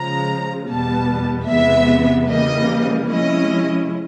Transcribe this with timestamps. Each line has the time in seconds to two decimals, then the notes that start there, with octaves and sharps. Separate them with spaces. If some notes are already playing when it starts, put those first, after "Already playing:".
Already playing: C#3 F3 G#3 A#5
0.68 E2 B2 G3 B3 A5
1.48 E2 C3 E3 G#3 B3 E5
2.29 C#3 E3 G3 A#3 D#5
3.10 C3 F3 G#3 C#4 E4 D#5